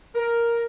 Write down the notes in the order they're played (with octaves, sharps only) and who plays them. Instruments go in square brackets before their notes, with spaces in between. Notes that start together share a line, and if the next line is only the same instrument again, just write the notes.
[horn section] A#4